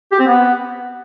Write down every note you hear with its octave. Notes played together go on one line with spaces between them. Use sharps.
G4
C4
B3